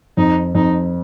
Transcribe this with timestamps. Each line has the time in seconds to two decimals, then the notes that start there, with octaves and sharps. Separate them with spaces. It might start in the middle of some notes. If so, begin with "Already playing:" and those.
0.17 F2 D#4
0.55 F2 D#4